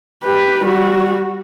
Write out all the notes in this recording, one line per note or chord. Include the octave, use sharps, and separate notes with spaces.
G4 B4
G3 F#4